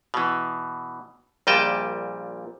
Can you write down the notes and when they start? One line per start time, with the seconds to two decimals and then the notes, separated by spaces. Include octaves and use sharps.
0.14 B2 E3
1.47 A#1 A#2 G3 D#5 G5 A5